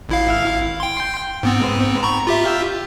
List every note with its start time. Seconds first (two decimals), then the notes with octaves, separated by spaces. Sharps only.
0.09 G#1 E4 F5
0.80 G5 C6
1.43 G#2 B3 C4
2.03 A#5 B5 C#6
2.27 F4 G4 E5